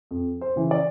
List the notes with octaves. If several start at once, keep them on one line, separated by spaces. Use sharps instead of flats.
F2
C5
C#3 E3
D5